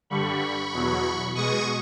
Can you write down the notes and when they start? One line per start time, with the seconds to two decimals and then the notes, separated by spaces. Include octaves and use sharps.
0.10 G2 D3 G3 B5 C#6
0.73 E2 B2 F#3
1.35 B2 G#3 C#6 D#6